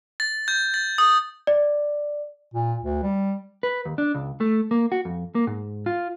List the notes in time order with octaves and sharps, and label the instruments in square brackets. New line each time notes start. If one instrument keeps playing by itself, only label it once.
[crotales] A6
G6
A6
D#6
[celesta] D5
[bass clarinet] A#2
D2
G3
[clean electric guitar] B4
D#2
D4
C#2
A3
A#3
F#4
F2
A#3
G#2
F4